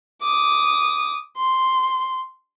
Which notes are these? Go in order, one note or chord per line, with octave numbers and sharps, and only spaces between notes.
D6 D#6
C6